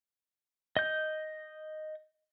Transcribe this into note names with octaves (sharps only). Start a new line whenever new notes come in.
D#5 G6